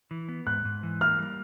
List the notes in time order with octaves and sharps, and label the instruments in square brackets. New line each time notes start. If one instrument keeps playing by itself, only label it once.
[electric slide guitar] E3
B3
[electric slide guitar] G#2 [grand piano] F#6
[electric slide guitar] G#2
E3
[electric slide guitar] A#3 [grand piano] F6
[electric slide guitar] G3